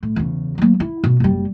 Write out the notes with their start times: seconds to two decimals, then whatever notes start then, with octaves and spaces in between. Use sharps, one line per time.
0.03 A2
0.16 E2 C#3
0.58 F#3 A#3
0.80 E4
1.04 B2
1.20 F#1 G3